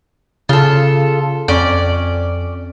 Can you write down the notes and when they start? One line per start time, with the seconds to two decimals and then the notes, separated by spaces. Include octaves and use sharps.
0.49 C#3 F4 A4
1.48 F2 C#4 D5